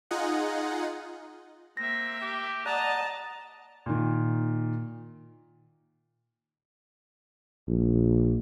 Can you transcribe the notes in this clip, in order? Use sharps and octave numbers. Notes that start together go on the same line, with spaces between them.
D#4 F4 G#4 D#5 F#5
A#3 C4 E5 A#6
G4
D5 D#5 F#5 A5 A#5 D#6
A#2 D#3
A#1